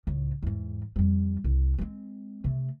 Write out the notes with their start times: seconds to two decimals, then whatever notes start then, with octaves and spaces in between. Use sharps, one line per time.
0.07 C#2 A2
0.43 E2 G#2
0.96 F2 G3
1.44 C2
1.78 G#3 C4
2.44 C3 A3